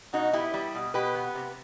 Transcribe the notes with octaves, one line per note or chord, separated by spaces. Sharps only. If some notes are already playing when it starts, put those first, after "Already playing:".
B2 D#4 F#4
B3 E4 G4
G3
B2
B2 G4 B4
B3
C3